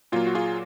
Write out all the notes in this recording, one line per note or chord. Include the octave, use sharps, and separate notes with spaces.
A#2 F#3 A#3 F4
F#4
F4 G#4